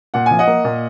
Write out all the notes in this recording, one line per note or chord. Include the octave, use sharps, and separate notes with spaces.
A#2 F#5
F3 G#5
D#5 F#5
A#3
A#2